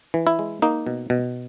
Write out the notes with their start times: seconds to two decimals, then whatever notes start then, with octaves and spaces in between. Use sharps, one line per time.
0.14 E3
0.27 E4
0.39 G#3
0.62 A#3 D#4
0.87 B2
1.10 B2